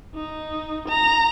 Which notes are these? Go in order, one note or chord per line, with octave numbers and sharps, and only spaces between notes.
D#4
A#5